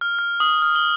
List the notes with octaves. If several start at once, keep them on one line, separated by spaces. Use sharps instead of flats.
F6
F6
D#6
F6
G7